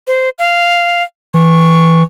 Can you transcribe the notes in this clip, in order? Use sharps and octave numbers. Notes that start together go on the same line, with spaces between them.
C5
F5
E3 C#6